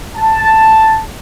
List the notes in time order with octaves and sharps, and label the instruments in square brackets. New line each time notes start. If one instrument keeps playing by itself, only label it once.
[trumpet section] A5